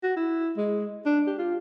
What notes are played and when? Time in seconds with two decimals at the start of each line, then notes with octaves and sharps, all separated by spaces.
0.03 F#4
0.16 E4
0.57 G#3
1.06 D4
1.27 G4
1.38 F4